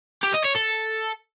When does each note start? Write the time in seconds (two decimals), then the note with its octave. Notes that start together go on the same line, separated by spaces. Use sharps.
0.23 G4
0.34 D#5
0.44 C#5
0.55 A4